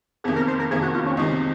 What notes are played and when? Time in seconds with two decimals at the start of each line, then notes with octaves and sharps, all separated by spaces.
0.24 F2 C3 D#3 A#3 G#4
0.36 A#4
0.48 C5
0.60 A#4
0.71 F2 C3 D#3 A#3 G#4
0.82 F#4
0.94 F4
1.06 C#4
1.17 C#2 C3 D#3 D#4